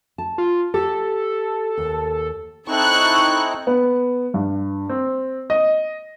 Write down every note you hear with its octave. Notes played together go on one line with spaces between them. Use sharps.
A5
F4
G4 A4
D#2
C4 D#4 E4 A4 C#6 F#6
B3
G2
C4
D#5